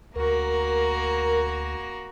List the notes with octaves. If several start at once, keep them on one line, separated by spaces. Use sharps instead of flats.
D2 A#3 F#4 A#4